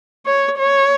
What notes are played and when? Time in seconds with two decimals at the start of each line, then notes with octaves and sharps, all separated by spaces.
0.26 C#5
0.59 C#5